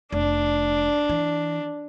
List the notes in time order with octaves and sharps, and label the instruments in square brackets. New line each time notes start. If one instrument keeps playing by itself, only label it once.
[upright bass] F1 [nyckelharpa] D4
[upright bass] E3